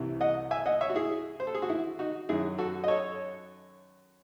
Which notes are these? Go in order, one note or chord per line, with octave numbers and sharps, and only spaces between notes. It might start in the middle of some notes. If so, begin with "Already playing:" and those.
Already playing: C2 C3 E3
D#5 F#5
E5 G#5
D#5 F#5
C#5 E5
F#4
E4 G#4
C5
A4
G#4
F#4
E4
D#4 F#4
F#2 D#3 F#3 E4 G#4
F#4 A4
D#5
A4 C#5